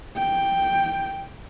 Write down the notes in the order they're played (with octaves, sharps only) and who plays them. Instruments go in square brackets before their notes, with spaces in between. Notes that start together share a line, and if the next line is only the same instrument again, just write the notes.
[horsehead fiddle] G5